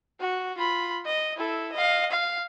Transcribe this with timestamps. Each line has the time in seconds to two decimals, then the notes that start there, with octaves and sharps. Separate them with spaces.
0.20 F#4
0.58 F4 B5
1.06 D#5
1.37 E4 A4
1.73 D#5 F5
2.11 F5